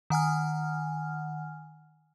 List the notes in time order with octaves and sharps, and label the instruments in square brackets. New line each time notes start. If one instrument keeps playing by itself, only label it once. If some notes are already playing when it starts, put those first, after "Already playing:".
[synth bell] D#3 F#5 G#5 F6